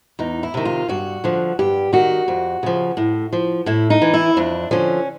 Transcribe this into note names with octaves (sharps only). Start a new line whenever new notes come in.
E2 D#4
E4
C3 D#3
F4
G2 F#4
D3 F3
G2 G4
D#3 F#4
F2
C#3 F3
A2
F3
A2 E4
D#4
E3
E4
F2 D4
D3 F3 C#4